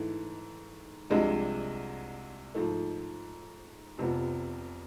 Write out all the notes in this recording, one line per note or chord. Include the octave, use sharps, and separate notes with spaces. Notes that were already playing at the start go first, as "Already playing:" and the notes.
Already playing: G#2 E3 A3
C2 C3 F3 G#3 D4
G#2 F3 A3
F1 F2 C3 F3 B3